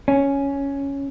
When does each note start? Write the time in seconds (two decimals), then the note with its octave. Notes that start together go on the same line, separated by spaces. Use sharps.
0.08 C#4